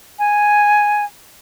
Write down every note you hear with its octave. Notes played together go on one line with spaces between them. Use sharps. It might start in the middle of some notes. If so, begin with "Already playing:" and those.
G#5